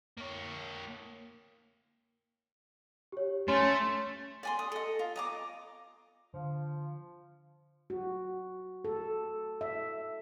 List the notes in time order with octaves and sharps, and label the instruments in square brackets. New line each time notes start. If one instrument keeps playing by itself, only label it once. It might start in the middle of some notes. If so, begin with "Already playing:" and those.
[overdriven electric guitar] A#3 C#5
[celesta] G4 C#5
[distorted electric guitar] A3 [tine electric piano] C#4 [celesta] C6
[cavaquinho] D5 G#5 C6
D#6
A4 D#5
F4
D#5 A#5 D6
[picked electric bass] D3 [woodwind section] F3
[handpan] F#4
A4
E5